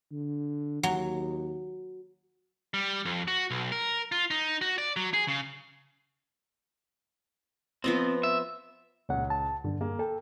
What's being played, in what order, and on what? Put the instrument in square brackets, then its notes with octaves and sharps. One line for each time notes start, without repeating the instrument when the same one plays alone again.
[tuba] D3
[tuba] D#2 [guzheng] F#3
[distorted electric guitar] G3
F2
F#4
B1
A#4
F4
D#4
F#4
D5
F#3
G#4
C#3
[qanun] F3 B3 D#5 [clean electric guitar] C4
[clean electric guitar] E5
[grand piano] C#2 C#5 [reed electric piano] A#2 F#5
[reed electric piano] A5
[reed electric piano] G2 [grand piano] D3
[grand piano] A#3 G#4
[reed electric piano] A4 [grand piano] G5